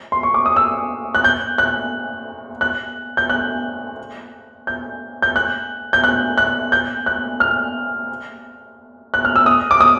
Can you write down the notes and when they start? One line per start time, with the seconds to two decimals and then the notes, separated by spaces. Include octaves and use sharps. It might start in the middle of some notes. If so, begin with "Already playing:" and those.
0.12 C6
0.23 C#6
0.34 D6
0.46 D#6
0.56 E6
1.15 F#6
1.24 G6
1.58 F#6
2.61 F#6
3.17 G6
3.30 F#6
4.67 G6
5.22 G6
5.36 F#6
5.93 G6
6.04 F#6
6.38 F#6
6.72 G6
7.06 F#6
7.40 F6
9.14 F#6
9.25 F6
9.36 E6
9.46 D#6
9.71 D6
9.81 D#6